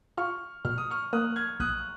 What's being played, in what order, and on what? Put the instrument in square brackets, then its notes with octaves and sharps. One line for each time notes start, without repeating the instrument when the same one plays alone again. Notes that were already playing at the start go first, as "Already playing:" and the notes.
[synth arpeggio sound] F4 [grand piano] C#6 F6
[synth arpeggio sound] B2 [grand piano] F6
[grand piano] D#6
C#6 F6
[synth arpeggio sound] A#3 [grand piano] D#6 F#6
[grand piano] F6 G#6
[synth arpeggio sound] B1 [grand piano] D#6 F#6